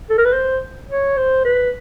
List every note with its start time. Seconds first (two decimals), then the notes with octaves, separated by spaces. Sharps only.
0.10 A4
0.18 A#4
0.25 B4
0.33 C5
0.89 C#5
1.17 C5
1.45 B4